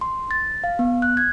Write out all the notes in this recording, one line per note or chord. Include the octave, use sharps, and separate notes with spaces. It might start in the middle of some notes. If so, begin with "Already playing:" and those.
C6
A6
F5
B3
F#6
G#6